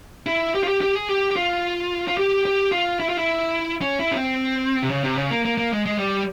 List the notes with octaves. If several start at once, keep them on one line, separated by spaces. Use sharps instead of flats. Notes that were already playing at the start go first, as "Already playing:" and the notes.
E4
G4
F4
G4
G4
G#4
G4
G4
F4
F4
G4
G4
F4
E4
F4
E4
C#4
E4
C#4
C4
C3
C#3
C3
C#3
A#3
A#3
A#3
G#3
G#3
G3